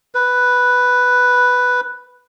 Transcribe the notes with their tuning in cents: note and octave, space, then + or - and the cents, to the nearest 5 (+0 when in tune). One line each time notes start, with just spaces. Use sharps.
B4 +0